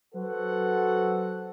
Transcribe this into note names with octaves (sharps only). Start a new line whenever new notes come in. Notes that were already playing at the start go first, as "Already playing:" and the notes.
F#3 F#4 A4 B4 C5 F#5